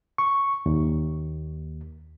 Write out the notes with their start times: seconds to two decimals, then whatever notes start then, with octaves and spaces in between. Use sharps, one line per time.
0.18 C#6
0.66 D#2